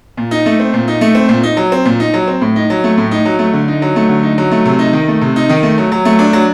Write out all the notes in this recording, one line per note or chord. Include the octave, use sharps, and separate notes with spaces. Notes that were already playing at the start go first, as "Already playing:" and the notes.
A#2
D#4
A3
C4
A#2
D#4
A3
C4
A#2
D#4
F#3
C4
A#2
D#4
F#3
C4
A2
D#4
F#3
A3
A2
D#4
F#3
A3
D3
D#4
F#3
A3
D3
D#4
F#3
A3
C3
D#4
D#3
A3
C3
D#4
D#3
A3
F#3
F#3
A3
D4
F#3